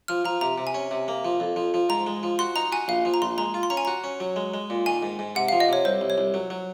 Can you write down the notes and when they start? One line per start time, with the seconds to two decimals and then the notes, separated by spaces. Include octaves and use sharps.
0.08 F3 F6
0.25 F3 A#5
0.41 C3 A#5
0.58 C3
0.67 G#5
0.74 C#4
0.91 C3
1.08 A#3
1.25 F3
1.40 F2
1.56 F3
1.74 F3
1.89 G#2 A#5
2.07 G#3
2.23 F3
2.39 F#4 C6
2.56 D#4 A#5
2.72 F#4 G#5
2.88 A#1 F5
3.05 F3
3.14 A#5
3.22 A#1 C6
3.38 G#3 A#5
3.54 F4
3.63 C6
3.70 C#4 A#5
3.77 G#5
3.85 F#4 A#5
4.04 C#4
4.20 F#3
4.36 G#3
4.54 G#3
4.70 A#2
4.86 D#3 G#5
5.03 G#2
5.19 G#2
5.35 C3 F#5
5.49 F5
5.52 F3
5.60 D#5
5.69 C3 C#5
5.85 C2 C5
6.01 C2
6.10 C#5
6.18 C2
6.34 F#3
6.50 F#3